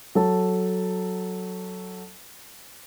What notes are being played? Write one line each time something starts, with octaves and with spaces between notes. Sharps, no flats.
F#3 A4 A5